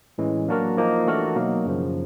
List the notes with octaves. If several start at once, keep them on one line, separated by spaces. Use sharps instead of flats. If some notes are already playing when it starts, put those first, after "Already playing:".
A2 E3 G#3 C#4
F#3 A#3 D4 F#4 A#4
F3 A#3 D#4
E3 A3 D4 F#4 A#4
B2 F#3 A#3 D#4
F#2 C#3 F3